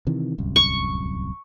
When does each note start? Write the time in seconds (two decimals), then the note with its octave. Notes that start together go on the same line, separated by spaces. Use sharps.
0.07 C3 D#3 E3
0.38 D1 C2 F#2
0.56 C#6